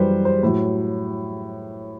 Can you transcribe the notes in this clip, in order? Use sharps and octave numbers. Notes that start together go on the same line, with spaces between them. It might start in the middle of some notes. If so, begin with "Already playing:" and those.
Already playing: F#2 E3 G3 B4 C5
C5
A2 F#3